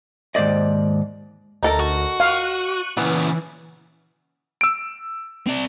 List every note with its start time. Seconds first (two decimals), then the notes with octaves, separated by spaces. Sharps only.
0.35 D#2 G#2 C5 D5 D#5
1.63 D2 D#4 A4 A#4
1.80 F#4
2.20 F5 C#6 F#6 D#7
2.97 A#2 C#3 E3 B3
4.61 E6 D7
5.47 C4 D5